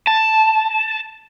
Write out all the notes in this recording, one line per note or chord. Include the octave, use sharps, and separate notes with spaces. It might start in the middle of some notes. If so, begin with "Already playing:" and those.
A5